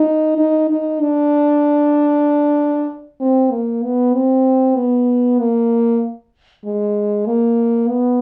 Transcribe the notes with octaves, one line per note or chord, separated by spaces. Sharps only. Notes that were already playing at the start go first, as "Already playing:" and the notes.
Already playing: D#4
D#4
D#4
D4
C4
A#3
B3
C4
B3
A#3
G#3
A#3
B3